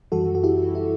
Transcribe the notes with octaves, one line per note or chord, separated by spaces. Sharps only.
F#2 E3 G3 F#4 A4
F#4
E4 G4
E4